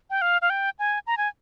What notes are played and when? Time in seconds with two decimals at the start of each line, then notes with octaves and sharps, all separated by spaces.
0.10 G5
0.22 F5
0.42 F5
0.50 G5
0.79 G#5
1.07 A#5
1.17 G#5